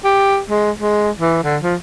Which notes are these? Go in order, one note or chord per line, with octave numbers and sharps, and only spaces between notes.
G4
G#3
G#3
E3
D3
F3